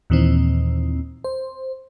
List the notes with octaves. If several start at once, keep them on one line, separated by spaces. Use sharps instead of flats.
D#2 A#2 D#3 E3 C4
C5